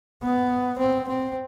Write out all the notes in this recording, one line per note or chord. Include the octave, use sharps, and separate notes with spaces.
B3
C4
C4